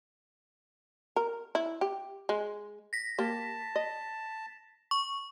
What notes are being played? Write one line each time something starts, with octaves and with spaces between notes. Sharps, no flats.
A#4
E4
G4
G#3
A#6 B6
A#3 G4 A5
D#5
C#6